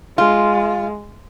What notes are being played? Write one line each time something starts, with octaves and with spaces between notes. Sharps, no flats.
G#3 F4